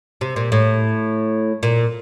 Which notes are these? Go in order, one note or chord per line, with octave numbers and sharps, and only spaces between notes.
C3
A#2
A2
A#2